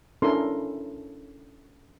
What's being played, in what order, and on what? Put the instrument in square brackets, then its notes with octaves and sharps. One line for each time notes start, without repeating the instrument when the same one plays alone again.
[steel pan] C#4 D4 E4 A4 A#4 C6